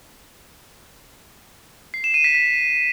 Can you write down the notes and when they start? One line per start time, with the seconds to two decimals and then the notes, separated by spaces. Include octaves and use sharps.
1.94 C7
2.04 E7
2.14 D#7
2.24 B6
2.35 B6